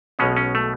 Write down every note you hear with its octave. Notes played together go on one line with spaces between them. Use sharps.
B1 B2 G#3 C#4
C#4
A3